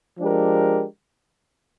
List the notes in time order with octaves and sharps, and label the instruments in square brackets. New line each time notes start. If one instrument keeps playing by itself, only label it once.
[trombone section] F3 G#3 D4 G4 A#4